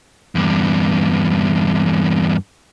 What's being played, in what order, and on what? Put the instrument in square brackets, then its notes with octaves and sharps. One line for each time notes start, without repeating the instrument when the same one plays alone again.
[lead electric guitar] E2 G2